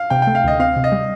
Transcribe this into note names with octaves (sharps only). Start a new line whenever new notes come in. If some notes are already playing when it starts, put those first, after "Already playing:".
Already playing: F5
C3 G5
A3 G5
F5
D2 D#5
C4 F5
C3
D#5
G3